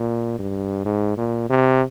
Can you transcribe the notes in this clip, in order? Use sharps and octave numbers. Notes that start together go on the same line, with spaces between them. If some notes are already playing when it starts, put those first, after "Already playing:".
Already playing: A#2
G2
G#2
A#2
C3